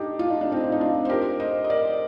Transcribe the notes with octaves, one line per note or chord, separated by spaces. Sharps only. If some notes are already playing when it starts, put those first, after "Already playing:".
Already playing: D4 D#4 G4
F4
D#4
D4
C4 D#4
F4
D#4
D4 F4
C5
G4 A#4
C5 D#5
D#5
A#4 D5